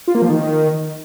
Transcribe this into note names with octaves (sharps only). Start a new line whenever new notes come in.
F4
A#3
F3
D#3